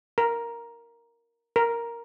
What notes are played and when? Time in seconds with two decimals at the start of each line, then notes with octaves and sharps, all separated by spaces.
0.18 A#4
1.56 A#4